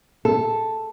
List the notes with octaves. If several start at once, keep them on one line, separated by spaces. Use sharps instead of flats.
A4